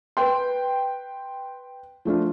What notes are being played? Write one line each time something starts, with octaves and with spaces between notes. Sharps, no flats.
B4 G5 C6
F3 A3 D4 F4